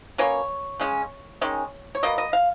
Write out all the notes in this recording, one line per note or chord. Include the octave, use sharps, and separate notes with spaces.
B2 A#3 C#4 C#5
C#3 G#3 C#4
D#3 G#3 C#4
C#5
B2 A#3 D#5
D#5
F5